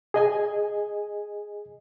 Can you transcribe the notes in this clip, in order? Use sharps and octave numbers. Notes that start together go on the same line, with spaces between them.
G#4 D#5 G#5